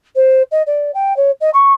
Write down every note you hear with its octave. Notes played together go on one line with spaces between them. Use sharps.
C5
D#5
D5
G5
C#5
D#5
C#6